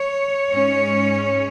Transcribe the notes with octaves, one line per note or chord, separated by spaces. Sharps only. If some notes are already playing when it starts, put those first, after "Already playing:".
Already playing: C#5
G#2 G#3 C#4